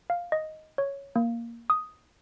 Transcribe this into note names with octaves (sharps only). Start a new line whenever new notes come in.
F5
D#5
C#5
A#3
D#6